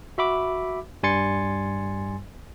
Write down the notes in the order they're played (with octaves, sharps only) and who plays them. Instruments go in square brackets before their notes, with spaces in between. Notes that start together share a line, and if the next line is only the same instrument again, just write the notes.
[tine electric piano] F#4 E5 B5 D6
G2 G3 G#5 C6 A6 C#7